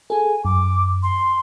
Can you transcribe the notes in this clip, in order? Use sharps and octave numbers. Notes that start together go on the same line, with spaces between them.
G#4 A4 G#5
F#2 D6
C6